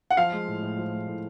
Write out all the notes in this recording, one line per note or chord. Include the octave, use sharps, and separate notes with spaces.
F#5
F3 F5
G#3
A2
A2
F3
G#3
A2